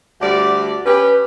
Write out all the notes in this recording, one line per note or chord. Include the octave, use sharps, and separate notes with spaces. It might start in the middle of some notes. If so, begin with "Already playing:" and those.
D2 G3 D5
C#4 G4 B4